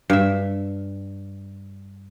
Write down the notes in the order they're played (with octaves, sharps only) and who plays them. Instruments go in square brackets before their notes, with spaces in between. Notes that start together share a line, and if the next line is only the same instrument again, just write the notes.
[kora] G2 E5